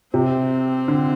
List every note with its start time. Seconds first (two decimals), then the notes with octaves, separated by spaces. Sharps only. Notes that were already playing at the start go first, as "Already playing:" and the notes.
0.14 C3 C4
0.88 D3